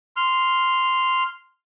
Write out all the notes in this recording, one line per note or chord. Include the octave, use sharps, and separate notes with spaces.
C6 F6